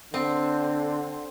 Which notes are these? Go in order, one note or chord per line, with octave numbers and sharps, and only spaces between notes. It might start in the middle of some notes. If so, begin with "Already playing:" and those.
D3 C4